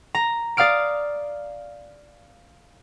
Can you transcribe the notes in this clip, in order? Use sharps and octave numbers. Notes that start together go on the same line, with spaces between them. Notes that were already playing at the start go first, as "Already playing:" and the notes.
A#5
D5 F5 D#6 F6 D7